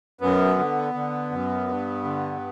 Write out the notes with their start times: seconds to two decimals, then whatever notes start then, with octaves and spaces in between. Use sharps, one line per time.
0.21 F#2 B3
0.58 D3
0.94 D3
1.31 F#2
1.68 G2
2.04 D3